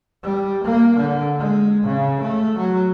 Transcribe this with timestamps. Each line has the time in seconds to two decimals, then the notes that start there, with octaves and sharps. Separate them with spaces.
0.23 G3
0.64 A#3
0.97 D3
1.39 G#3
1.85 C#3
2.21 A3
2.58 F#3